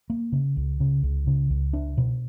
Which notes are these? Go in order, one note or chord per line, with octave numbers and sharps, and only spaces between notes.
A#3
C#3
C#2
C#3
C#2
C#3
C#2
D4
B2